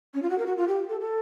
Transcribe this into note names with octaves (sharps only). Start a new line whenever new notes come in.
C#4
F4
F#4
A#4
F#4
F4
G4
A4
A4